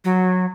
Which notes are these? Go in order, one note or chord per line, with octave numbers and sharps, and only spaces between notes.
F#3